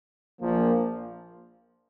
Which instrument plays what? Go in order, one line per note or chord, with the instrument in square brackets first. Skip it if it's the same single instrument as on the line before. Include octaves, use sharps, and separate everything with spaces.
[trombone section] A#1 A#2 F3 A#3